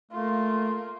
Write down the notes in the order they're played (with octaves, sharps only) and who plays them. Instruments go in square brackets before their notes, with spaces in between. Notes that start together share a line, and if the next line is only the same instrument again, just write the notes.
[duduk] A3 [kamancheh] A#3 F4